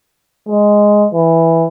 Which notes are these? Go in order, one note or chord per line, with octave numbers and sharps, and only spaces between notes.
G#3
E3